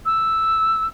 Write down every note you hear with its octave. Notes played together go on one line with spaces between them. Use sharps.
E6